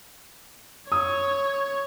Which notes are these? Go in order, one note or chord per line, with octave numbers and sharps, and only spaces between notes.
C#5 D#6